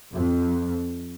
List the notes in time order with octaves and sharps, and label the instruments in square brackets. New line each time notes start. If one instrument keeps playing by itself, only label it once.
[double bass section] F2